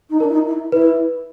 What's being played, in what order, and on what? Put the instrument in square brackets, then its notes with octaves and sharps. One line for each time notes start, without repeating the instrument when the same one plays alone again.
[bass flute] D#4
[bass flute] D4 [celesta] A#4
[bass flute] E4
D#4
E4
[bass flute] E4 [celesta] B4